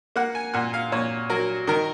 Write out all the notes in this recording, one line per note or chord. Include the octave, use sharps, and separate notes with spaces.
A#3 F#5
G#5
A#2 F#5
F5
A#2 C#5
F#3 A#4
D#3 A#4